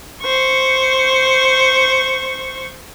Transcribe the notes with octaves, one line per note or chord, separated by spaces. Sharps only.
C5 C#6